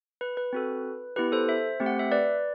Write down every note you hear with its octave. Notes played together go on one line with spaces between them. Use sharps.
B4
B4
C4 F#4 A4
B3 E4 G4 B4
A4 C5
C5 E5
A3 C4 G4
F#5
E5
B4 D5